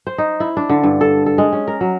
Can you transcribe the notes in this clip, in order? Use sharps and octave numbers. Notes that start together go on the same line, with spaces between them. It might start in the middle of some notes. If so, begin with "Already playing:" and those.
C5
D#4
E4
D4
D3
G2
A4
A4
G#3
C#4
A#4
F#3